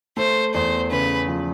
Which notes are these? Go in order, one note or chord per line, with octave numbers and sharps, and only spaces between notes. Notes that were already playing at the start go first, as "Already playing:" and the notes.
A3 C5
E2 C5
C#3 B4
F3